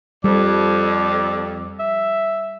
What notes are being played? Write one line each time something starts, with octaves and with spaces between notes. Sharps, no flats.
F2 G3 D5
E5